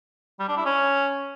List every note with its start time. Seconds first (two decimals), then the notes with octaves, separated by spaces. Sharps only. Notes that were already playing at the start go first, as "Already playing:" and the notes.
0.40 G3
0.48 D4
0.57 E4
0.66 C#4